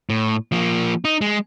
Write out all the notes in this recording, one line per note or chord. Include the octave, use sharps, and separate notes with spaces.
A2
F3 A#3
D#4
G#3